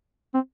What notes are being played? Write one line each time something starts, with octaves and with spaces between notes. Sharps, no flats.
C4